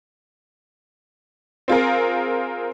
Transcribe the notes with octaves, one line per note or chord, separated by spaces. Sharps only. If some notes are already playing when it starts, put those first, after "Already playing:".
C4 F4 G#4 A#4